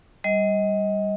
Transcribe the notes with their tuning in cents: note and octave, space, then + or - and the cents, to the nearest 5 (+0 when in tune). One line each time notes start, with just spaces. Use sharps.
G3 +0 D#5 +25